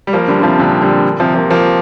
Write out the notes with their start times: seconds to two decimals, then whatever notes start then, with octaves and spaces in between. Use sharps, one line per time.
0.07 G3
0.13 F3 A#3
0.28 D3 G3
0.40 D3
0.43 C3 F3
0.59 A#2 D3
0.82 D3 G3
1.20 C3 F3
1.35 F3 A#3
1.50 F3 A#3